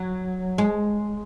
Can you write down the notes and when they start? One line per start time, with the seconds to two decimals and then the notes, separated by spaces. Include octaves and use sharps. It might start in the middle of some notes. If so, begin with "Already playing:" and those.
Already playing: F#3
0.58 G#3